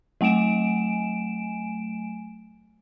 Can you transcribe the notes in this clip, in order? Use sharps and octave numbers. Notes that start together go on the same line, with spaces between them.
F#3 A3 G#5 D7 E7